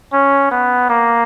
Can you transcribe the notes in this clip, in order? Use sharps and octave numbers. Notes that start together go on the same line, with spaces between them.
C#4
B3
A#3